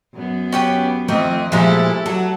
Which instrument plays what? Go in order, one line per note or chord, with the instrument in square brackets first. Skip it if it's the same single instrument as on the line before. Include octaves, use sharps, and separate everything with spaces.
[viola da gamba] F#2 B3
[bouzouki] C#4 G4 B4
[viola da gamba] F2 C4 D#5 [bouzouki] D#3 E3 [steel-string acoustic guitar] A3
[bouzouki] A#2 G#3 E5 [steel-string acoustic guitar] F3 [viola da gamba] E4 G4 A4
[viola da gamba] F#3 [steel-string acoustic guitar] F#4 [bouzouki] A4